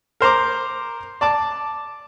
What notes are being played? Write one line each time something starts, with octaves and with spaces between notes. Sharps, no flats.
A#4 C5 A#5 D6
D5 A5 D6